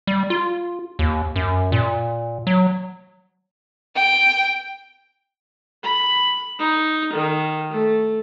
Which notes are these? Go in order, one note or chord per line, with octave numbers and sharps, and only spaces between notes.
G3
F4
D#2
F#2
A#2
F#3
G5
B5
D#4
D#3
A3